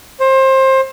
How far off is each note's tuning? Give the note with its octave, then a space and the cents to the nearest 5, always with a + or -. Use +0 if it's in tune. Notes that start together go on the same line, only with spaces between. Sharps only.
C5 +25